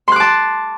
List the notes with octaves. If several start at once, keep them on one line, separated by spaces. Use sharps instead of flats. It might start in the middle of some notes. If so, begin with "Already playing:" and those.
A5 C6 D6 F#6